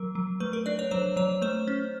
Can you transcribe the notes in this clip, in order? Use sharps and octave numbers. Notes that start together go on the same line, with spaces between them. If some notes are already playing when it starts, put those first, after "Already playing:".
Already playing: F#3 A#4
F#3
A3 B4
A#4
D4 D5
C#5
F#3 C5
F#3 C#5
A3 C5
C#4